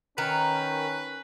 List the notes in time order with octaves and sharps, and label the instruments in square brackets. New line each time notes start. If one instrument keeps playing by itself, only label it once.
[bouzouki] D#3 A#4 [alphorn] C#4 [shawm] B4